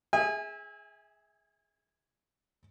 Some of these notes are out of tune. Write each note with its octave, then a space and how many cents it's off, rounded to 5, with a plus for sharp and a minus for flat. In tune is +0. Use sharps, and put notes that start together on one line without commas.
G#4 +0 E5 -25 G#5 -35